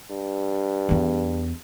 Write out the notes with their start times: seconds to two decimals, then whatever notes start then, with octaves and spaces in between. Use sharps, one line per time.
0.10 G2
0.89 E2 B3